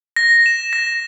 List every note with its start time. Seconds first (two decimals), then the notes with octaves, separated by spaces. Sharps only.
0.16 A#6
0.46 E7
0.73 A#6